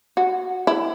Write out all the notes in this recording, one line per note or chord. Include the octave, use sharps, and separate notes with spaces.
F#4
E4